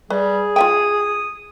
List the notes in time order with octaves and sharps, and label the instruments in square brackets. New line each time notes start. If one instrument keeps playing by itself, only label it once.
[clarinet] G3 [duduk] G#4 [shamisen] B4
[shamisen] F4 E5 G5 [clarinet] D#6